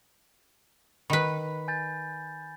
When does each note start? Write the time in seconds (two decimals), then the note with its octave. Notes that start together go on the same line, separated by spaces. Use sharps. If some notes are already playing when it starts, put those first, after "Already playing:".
1.10 D#3 B4 B5
1.68 G#5 G6 A6